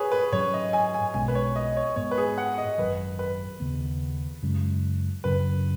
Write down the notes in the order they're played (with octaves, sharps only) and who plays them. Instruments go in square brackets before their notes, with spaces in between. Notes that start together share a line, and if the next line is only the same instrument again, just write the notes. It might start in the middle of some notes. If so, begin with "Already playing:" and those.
Already playing: [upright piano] G#4 B4 C#5
B4
[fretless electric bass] G#2 F#3 C#4 [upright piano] C#5
[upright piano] D#5
G#5
G#5
[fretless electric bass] B1 B2 G#3 C#4 [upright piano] G#5
[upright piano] B4
C#5
D#5
C#5
[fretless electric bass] G#2 G#3 B3 [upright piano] C#5
[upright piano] B4
G#4
F#5
D#5
[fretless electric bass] G#1 F#2 D#3 F#3 [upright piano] B4
[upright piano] B4
[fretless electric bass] D#2 C#3 B3
F#2 C#3 G#3
[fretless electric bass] F#2 C#3 F#3 [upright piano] B4